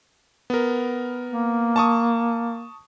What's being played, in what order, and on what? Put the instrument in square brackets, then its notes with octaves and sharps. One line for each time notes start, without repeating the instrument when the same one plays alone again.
[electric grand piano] B3 A#4
[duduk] A#3
[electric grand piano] A5 C#6 D#6